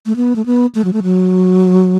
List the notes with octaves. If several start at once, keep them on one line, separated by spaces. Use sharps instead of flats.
A3
B3
A3
B3
A3
F#3
A3
F#3